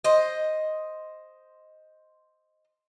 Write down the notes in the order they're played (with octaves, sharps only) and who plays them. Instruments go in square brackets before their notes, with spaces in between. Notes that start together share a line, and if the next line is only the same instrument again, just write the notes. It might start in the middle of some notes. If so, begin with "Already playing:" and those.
[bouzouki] C5 D#5